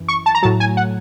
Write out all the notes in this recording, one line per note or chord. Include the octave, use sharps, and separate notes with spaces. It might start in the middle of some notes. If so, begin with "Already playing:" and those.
Already playing: F#2 E3
C#6
A5
A#5
A2 F#3 A5
G#5
F#5